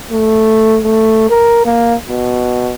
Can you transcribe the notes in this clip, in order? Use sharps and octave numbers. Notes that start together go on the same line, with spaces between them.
A3
A3
A#4
A#3
B2